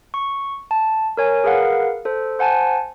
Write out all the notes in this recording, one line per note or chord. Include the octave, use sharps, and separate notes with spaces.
C#6
A5
A#4 C#5 G#5
G#4 A#4 B4 F5 F#5
A4 C5
C5 F#5 G#5 A5